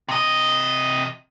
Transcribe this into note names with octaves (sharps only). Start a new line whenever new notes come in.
C3 D#5